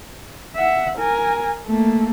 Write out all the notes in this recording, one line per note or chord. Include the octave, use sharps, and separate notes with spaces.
E5 F#5
A#4 G#5
A3 A#3